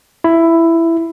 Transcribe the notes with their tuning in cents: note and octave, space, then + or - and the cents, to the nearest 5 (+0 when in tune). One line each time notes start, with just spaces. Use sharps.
E4 +10